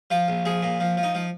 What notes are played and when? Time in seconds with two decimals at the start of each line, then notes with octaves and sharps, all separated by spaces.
0.11 F3 F4
0.28 A#1
0.45 F3 G#4
0.63 A#2
0.80 F3
0.97 F3
1.03 D#4
1.15 F3